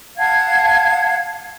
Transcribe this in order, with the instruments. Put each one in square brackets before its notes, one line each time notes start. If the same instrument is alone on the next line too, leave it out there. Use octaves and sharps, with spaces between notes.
[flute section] F5 F#5 A5 G#6